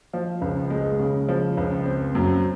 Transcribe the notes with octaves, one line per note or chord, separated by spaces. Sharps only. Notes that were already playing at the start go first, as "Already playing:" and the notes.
F3
C#2
G#3
C#3
F3
C#2
C4
F#2